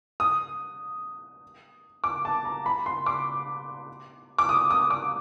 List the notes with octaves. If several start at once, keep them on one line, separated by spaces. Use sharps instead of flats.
D#6
D6
A5
A#5
B5
C6
D6
D6
D#6
D#6
D6